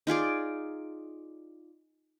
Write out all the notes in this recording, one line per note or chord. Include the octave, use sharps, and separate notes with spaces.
D#4 F4 G#4 D5